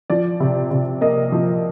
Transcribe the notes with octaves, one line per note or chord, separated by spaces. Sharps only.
F3 D5
C3
C3
A#3 D#5
F3